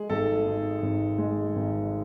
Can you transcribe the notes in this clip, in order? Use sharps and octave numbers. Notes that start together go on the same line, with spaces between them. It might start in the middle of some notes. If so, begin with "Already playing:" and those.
Already playing: G#3 G#4
G#1 A4
G#2
G#1
G#3
G#1